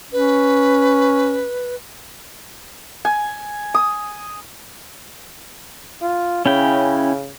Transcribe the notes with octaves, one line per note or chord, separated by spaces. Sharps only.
C#4 B4
G#5
D#6
F4
C#3 C#4 E4 G5